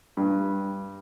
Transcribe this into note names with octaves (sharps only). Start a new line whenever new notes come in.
G2